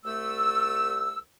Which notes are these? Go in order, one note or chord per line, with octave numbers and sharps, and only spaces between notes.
C2 A3 E6